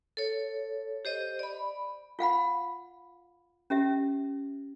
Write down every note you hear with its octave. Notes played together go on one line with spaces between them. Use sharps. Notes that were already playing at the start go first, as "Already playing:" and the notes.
A4 C#5
G4 C5 D#5
D5 B5
F4 F5 F#5 B5
C#4 G4 E5